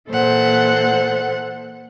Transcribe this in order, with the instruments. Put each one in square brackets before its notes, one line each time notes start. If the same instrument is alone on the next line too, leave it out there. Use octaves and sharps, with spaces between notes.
[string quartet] A#2 E3 A4 C5 F#5